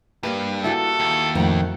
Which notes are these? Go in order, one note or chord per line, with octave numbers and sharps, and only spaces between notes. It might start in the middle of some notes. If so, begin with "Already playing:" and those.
G2 G3 A#3 B4
E4 F#4 G4 A4
D#2 B5
F2 A2 D#3 F#4 F#5